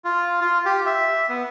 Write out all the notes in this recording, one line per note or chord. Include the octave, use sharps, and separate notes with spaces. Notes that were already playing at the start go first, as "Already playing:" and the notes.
F4
F4
G4
E5
B3